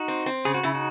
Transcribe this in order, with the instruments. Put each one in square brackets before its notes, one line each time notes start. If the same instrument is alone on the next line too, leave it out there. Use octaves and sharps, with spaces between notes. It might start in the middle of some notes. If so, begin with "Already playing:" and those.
Already playing: [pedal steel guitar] D#4 F#4
[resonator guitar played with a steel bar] C4
C4
[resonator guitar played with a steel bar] C#3 [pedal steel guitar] G#4
[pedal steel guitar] F#4
[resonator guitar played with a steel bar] C#3 [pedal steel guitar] E4
[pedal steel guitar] D#4 F#4